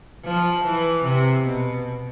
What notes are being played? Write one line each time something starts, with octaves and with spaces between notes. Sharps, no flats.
F3
E3
C3
B2